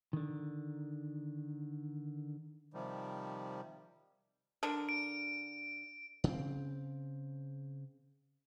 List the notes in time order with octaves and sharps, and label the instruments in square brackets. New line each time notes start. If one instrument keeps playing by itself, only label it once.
[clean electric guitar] D3 D#3
[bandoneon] C3 D#3 F3 G3
[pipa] D3 D4 A#4
[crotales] D7
[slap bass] C#3 C4